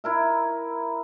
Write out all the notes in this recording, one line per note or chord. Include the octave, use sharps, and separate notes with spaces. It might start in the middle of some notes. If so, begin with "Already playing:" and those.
E4 A#4 E5